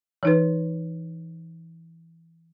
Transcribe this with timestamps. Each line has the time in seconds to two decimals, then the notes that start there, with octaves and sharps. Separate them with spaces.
0.23 E3 D#4 B4